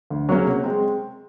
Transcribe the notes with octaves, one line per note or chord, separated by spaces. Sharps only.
D2
C#3 F#3 A#3 C#4
C3
G#3 C4